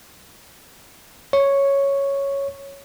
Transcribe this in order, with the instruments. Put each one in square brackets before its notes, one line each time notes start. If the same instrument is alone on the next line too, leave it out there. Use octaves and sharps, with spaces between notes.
[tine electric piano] C#5